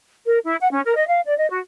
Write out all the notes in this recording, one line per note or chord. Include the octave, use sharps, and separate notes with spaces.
A#4
E4
F#5
C#4
A#4
D#5
F5
D5
D#5
F#4